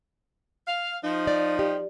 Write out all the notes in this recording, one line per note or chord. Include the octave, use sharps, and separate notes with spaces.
F5
F3 D#4
D5
G4